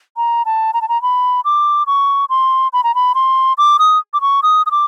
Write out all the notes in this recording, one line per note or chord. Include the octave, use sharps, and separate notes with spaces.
A#5
A5
A#5
A5
A#5
B5
D6
C#6
C6
B5
A#5
B5
C6
D6
D#6
D6
C#6
D#6
D#6
D6